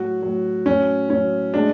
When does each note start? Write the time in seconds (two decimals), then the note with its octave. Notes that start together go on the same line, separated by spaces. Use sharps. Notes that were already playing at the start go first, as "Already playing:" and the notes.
Already playing: A2 F#3 F#4
0.22 A2 F#3
0.66 A2 F#3 C#4
1.10 A2 F#3 C#4
1.54 A2 G#3 D4